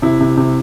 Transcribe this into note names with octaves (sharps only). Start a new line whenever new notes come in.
C3 E4
C3
C3